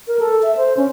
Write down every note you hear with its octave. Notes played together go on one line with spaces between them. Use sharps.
A#4
A4
E5
C5
C#4